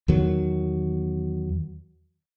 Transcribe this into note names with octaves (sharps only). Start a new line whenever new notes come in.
E2 D#3 F#3